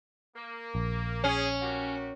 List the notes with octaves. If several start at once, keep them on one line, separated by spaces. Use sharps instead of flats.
A#3
A#1
C#4 G#4
A#3 F#4 G4